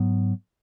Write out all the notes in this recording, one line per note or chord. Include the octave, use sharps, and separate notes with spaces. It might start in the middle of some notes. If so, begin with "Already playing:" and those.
Already playing: G#2 F#3 B3